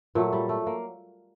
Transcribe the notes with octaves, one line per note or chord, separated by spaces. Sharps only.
A#2 F#3 A3
G3
A3
A#3